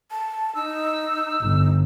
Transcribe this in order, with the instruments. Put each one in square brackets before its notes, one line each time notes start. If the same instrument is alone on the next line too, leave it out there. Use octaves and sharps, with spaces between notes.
[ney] A5
[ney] D#4 [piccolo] E6
[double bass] G1